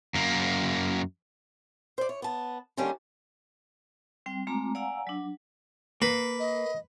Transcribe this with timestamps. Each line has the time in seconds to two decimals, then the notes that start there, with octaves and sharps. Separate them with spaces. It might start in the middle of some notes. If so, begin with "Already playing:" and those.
0.15 F#2 A#3
1.98 C5 D5
2.09 C#5
2.22 B3 A5
2.77 D3 D#3 G3 A#3 C#4 D4
4.26 G3 C4 G5
4.47 G#3 A3 C4 F4 A#5 D6
4.75 D5 F5 F#5 G#5 A#5 E6
5.07 F#3 D4
6.02 A#3 B4
6.39 D#5